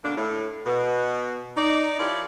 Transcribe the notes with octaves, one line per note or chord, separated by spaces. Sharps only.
B2 D3 A#3 D4
A2
B2
D#4 D5
F3 E4 G4 A#4 C#5 D5